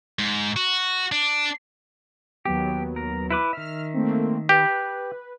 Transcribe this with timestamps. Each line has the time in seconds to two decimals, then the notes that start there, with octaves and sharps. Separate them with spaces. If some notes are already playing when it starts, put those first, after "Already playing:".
0.19 G#2
0.56 F#4
1.12 D4
2.45 D#2 F#3 B3 G4
2.96 A#4
3.30 E4 B4 D6
3.53 D#3 E5 F6
3.94 A3 A#3 C4
4.49 G4 B4